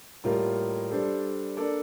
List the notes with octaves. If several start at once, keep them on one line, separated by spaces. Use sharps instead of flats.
A2 G3 A#3 F4 A#4
G3 D4 A4 C5
A#3 D4 A4 D5